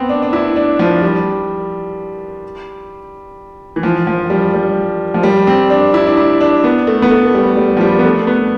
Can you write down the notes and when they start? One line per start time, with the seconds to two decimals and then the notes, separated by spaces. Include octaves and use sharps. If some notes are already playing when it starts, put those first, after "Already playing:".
Already playing: B3 C4
0.09 D4
0.22 D4
0.33 E4
0.56 D4
0.79 F3
1.02 G3
3.76 E3
3.83 F3
4.07 F3
4.30 G3
4.54 G3
5.14 F3
5.23 G3
5.47 C4
5.70 D4
5.94 E4
6.07 D4
6.17 E4
6.40 D4
6.64 B3
6.87 A3
7.02 B3
7.11 A3
7.26 A3
7.34 G3
7.57 G3
7.77 F3
7.81 G3
7.99 B3
8.05 A3
8.27 B3